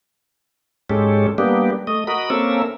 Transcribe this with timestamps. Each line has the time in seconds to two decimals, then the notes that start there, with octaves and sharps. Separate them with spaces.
0.90 G#2 G#3 C#4 G4 A4
1.38 G3 A#3 B3 D4 G4
1.87 A3 D#5
2.07 F#4 A#4 D#5 B5
2.30 A#3 C4 C#4 A4 A#4 E5